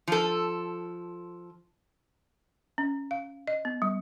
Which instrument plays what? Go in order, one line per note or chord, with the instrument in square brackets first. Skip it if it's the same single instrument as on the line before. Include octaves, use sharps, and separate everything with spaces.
[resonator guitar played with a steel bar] F3 A4
[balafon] C#4
F5
D#5
B3
G3